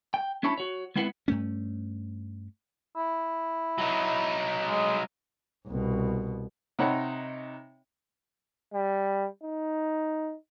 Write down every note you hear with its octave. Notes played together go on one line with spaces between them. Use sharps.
G5
C#4 D4 E4 C#5 A5 B5
F#4 C#5
G#3 B3 C4 E4 B4 F#5
G2 A3 C#4
E4
F#3 D#4
G#3
C2 B2
C3 D#4 C#5 F#5 B5
G3
D#4